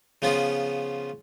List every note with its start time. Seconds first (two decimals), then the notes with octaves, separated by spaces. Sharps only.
0.22 C#3 F3 B3 C#4 F4